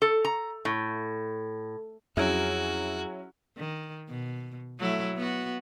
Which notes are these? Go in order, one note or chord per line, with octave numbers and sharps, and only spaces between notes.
A4
A#5
A2
F2 F#3 C#4 E4 F#4 G#4 G#6 D7
D#3
B2
F#3 A3 E4
B3 F#4